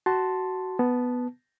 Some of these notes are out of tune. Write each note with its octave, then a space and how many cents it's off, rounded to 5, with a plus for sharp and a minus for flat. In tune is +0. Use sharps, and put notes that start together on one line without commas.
F#4 +15 A5 +0 C6 +0
B3 +0 A5 -10